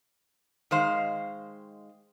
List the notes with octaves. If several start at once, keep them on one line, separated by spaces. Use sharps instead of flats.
D#3 G#3 C5 F5